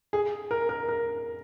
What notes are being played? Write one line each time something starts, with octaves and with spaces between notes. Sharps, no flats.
G#4
A#4
A#4
A#4